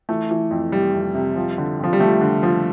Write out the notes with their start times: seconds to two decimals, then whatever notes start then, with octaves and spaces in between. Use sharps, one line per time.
0.09 E3 A3
0.31 E3
0.51 F2
0.72 C3 G3
0.95 F2
1.15 C3
1.36 F3
1.58 D3
1.79 F2 F3
1.93 G3
2.00 F3 A3
2.21 D3
2.43 F3